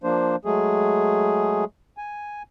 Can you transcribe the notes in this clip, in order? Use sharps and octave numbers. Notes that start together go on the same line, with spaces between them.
F3 A#3 D4 C5
F#3 G#3 A3 G#4
G#5